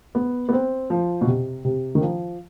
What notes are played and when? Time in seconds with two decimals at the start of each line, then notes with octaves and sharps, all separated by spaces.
0.15 B3
0.49 B3
0.53 C4
0.90 F3
1.21 B2
1.27 C3
1.65 C3
1.95 D#3
2.01 F3